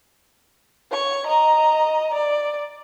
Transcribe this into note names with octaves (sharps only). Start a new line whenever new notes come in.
C#5 C#6
D#5 A#5
D5